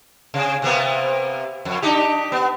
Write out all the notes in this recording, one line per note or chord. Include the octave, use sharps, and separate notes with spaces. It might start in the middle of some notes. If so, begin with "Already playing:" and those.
C3
C3 A#3 B3
F2
D4 D#4 G4
B3